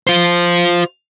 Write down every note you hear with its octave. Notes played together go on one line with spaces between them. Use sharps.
F4 C5